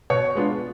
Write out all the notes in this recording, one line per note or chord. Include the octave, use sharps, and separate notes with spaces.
B2 C#5 C#6
G#3 B3 D4 F4